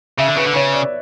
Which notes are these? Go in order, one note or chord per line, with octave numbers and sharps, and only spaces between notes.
C#3 E5
D3
C#3 B4
D3
C#3 C#5
D5